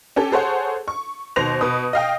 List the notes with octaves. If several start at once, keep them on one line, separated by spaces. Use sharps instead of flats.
C#4 G4 A4
G#4 A4 C5 C#5 F#5
C#6
D#2 B2 C5 A#6 F7
B2 B4 D#6
D#5 F5 G5